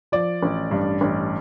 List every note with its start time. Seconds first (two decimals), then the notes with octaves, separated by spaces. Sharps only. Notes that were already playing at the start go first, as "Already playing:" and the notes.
0.12 F3 D5
0.42 A1
0.71 G2
1.01 A1